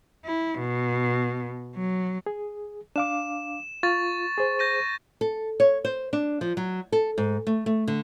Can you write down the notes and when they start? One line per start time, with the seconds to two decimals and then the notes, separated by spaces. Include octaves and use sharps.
0.25 E4
0.59 B2
1.75 F#3
2.26 G#4
2.96 D4 F5 D6 E7
3.83 F4 C#6 A6
4.38 G#4 C5
4.59 G6 A#6 D#7
5.21 A4
5.60 C#5
5.85 C5
6.13 D4
6.41 F3
6.57 F#3
6.92 A4
7.18 G#2
7.47 A3
7.66 A3
7.88 D3